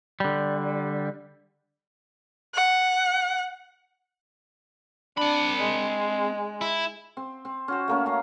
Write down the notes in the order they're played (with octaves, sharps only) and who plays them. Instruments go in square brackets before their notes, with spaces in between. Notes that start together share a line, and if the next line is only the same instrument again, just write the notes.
[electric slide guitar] D3 G3
[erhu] F#5
[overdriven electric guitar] C4 B5 [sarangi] D4
[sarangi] G#3
[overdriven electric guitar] E4
[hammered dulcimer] C4
C4
C#4 F#4 C5
A3 A#3 C#4
F5 A#5